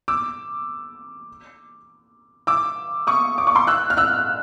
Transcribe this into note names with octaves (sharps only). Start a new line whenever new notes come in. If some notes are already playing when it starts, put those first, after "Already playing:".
D6 E6
D6 E6
C#6 D#6
D6
C#6
C6 D6
E6 F#6
F6
E6 F#6